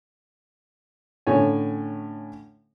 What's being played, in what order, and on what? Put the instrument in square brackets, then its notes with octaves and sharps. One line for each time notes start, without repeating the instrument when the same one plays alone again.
[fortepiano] A2 D3 C#4 C#5 G#5